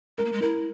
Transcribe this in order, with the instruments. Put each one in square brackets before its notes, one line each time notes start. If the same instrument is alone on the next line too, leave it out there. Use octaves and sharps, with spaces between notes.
[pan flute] G#3 [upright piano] A#4
[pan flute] A#3
G#3
[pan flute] E4 [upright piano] A#4